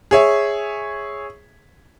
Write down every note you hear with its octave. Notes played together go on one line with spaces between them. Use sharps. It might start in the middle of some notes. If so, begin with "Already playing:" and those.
G#4 C#5 E5